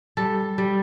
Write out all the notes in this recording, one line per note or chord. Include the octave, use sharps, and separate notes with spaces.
G3 A4
G3